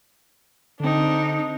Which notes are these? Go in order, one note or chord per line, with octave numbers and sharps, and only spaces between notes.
D3 C4 D4 D#4